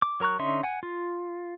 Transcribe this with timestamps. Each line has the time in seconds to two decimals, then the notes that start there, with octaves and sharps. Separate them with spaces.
0.02 D6
0.20 F#3 A#4 A#5 C#6 F#6
0.39 D3 C#4 D#4 E5 C6
0.63 F#5 G#5
0.83 F4